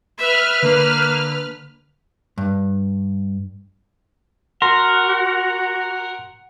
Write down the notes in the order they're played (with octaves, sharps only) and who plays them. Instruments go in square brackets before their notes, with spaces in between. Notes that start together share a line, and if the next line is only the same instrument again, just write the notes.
[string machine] B4 F6 [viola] E5
[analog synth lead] D3 [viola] A#3
[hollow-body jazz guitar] G2
[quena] F#4 [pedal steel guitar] A#4 [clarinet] F#5 [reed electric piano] C6